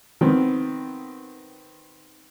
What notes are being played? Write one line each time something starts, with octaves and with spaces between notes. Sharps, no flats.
D#3 B3 C4